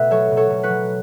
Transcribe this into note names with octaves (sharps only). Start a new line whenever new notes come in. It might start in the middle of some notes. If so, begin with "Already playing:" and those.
Already playing: B2 A3 B4 E5
F#3 A4 C#5
B2
A4 C#5
B2
F#4 B4
F#3